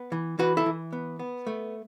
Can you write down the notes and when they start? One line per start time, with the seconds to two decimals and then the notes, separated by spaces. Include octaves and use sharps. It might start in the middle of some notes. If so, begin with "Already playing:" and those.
Already playing: B3
0.12 E3
0.39 E3 F#4 B4
0.57 E4 A4
0.66 E3
0.93 B3
1.19 B3
1.47 A3